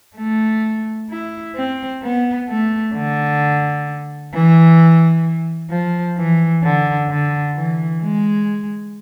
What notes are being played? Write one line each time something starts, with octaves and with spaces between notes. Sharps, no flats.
A3
E4
C4
B3
A3
D3
E3
F3
E3
D3
D3
E3
G#3